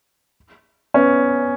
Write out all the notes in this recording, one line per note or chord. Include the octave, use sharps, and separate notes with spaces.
B3 C#4